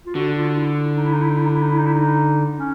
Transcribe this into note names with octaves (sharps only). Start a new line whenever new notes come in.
F4
D3 F#4
F4
E4
D#4
E4
D#4
E4
D#4
E4
D#4
E4
D#4
E4
D#4
E4
D#4
C#4